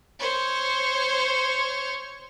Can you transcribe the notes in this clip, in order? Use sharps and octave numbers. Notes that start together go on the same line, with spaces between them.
C5 C#5